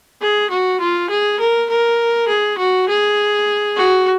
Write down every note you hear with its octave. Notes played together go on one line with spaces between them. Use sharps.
G#4
F#4
F4
G#4
A#4
A#4
G#4
F#4
G#4
F#4